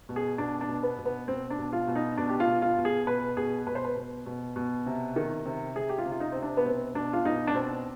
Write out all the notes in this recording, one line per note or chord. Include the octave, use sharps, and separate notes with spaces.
B2
G#4
B2 D4
D4
B2
B3
B2
B3
B2 C4
D4
B2
F4
B2
D#4
B2 D4
G4
F4
B2
F4
B2
G#4
B2 B4
B2 G#4
B2 B4
C5
B4
B2
B2
B2
C3
D#3
C3
C3 G#4
G4
F4
C3
F4
D#4
C3 C4
D4
B3
B2 C4
B2 D4
F4
B2 D#4
D4
B2 C4